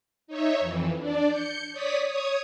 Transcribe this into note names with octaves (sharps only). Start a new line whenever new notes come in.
D#4 C#5 E5
F2 E3
D4 D5
G6 C#7
C#5 D5 D#6 B6
C#5 D#6 G#6